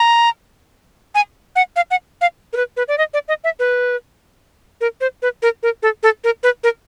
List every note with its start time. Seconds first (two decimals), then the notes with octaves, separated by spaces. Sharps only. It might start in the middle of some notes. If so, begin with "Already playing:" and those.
Already playing: A#5
1.15 G#5
1.56 F#5
1.76 F5
1.91 F#5
2.21 F5
2.53 A#4
2.57 B4
2.77 B4
2.88 D5
2.98 D#5
3.14 D5
3.28 D#5
3.44 E5
3.59 B4
4.81 A#4
5.01 C5
5.22 B4
5.42 A#4
5.63 A#4
5.83 A4
6.03 A4
6.24 A#4
6.43 B4
6.64 A#4